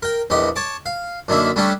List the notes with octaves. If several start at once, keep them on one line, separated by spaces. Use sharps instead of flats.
A#4 G5
A#1 E2 G4 D#5
C#5 A5 D6
F5
F#2 D3 D#3 A#3 E5
G3 A3 C#4 D4 G4